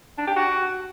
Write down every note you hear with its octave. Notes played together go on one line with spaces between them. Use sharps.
D4
G4
F#4